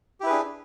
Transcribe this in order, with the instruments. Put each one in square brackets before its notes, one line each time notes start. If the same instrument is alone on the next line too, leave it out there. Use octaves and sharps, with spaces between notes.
[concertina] G4
E4
B4
G#4
D4